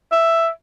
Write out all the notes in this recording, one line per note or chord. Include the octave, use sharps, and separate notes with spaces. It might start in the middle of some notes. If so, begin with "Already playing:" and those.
E5